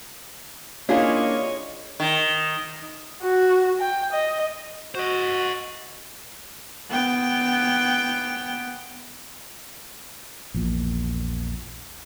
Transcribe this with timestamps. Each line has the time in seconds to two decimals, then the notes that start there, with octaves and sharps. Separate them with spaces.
0.89 A#3 C#4 D4 E4 F4 G#4 C#5 D#5
2.00 D#3
3.23 F#4
3.80 G5
4.12 D#5
4.95 F#4 C5 D#5
6.90 B3 G5
10.54 A#1 E2 A#2